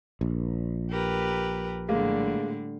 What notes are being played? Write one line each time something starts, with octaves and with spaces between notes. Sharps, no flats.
A#1
G4 A#4 B4
A2 D3 G3 G#3 A#3